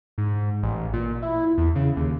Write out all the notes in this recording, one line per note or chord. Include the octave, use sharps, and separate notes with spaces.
G#2
A1
A#2
E4
E2
C#3
D#2